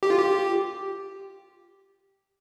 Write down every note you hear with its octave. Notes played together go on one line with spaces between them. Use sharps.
G4
F4
G4